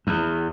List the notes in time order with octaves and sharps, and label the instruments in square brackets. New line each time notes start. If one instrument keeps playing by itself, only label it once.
[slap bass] E2